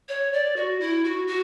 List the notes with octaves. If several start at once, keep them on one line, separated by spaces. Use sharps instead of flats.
C#5
D5
F#4
E4
F#4
F#4